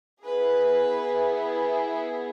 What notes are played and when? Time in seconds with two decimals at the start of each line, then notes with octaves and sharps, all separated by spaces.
0.24 B3 E4 G#4 B4